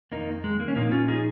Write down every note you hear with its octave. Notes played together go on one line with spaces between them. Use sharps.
F2 D#3 A#3 D#4
G#3
A#3
C#4
A#2 F3 A#3 D#4
C#4 F4
D#4 G#4